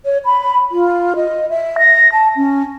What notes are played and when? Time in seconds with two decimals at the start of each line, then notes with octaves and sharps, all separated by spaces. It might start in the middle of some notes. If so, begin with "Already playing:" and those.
0.05 C#5
0.25 B5
0.72 F4
1.16 D#5
1.50 E5
1.79 A#6
2.12 A5
2.36 C#4